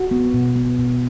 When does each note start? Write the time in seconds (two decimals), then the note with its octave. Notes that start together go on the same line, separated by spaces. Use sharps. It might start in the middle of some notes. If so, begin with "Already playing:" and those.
Already playing: F#4
0.11 B3
0.34 B2
0.56 B3
0.79 B2